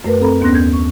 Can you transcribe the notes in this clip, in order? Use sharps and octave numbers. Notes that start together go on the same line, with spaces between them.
F#2 A3 A#4 B4
C4 A4 A#5 B5
D#2 B3 C#4 C6 F#6 A#6
G6 G#6
C#6